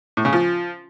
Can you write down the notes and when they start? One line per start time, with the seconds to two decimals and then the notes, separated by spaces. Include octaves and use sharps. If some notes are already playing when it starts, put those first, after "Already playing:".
0.17 A2
0.25 C#3
0.33 F3